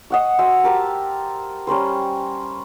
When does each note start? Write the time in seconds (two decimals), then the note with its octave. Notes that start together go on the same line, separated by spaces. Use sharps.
0.10 D#5 F#5 C#6
0.39 F#4 C5 E5 G#5
0.64 G4 A#4 A5
1.67 G3 C#4 A#4 C5